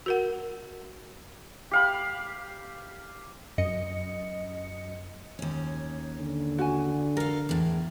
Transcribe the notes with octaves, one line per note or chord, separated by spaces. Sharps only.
F#4 A#4 F#5
G4 F5 B5
F#2 D#5 C#7
D#2 C#4
D3
F#4 G#5
A4 A#4 F5
E2 A2